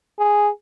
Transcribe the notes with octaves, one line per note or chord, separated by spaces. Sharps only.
G#4